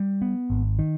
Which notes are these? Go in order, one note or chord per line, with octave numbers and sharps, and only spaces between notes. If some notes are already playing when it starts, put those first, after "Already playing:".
Already playing: G3
B3
G#1
D#3